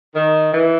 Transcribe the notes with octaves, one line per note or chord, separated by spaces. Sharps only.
D#3
E3